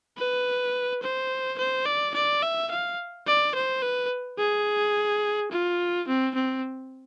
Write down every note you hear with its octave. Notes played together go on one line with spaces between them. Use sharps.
B4
C5
C5
D5
D5
E5
F5
D5
C5
B4
G#4
F4
C4
C4